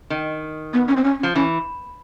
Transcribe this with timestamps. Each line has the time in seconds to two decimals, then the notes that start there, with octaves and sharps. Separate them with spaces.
0.10 D#3
0.73 B3
0.88 C#4
0.97 C4
1.04 C#4
1.19 C#4
1.23 F3
1.35 E3 C#4